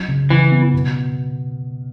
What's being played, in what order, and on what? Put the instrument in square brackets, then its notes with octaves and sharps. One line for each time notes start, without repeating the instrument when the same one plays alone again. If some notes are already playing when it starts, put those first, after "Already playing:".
Already playing: [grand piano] F#3 C#4
C#3
[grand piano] C#3 [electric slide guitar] E3
[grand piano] B3
B2